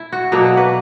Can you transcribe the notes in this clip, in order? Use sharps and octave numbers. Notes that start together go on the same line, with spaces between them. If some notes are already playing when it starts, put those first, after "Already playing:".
Already playing: E4
F#4
B2 F#3 A#3 D4 E4
F#4
B4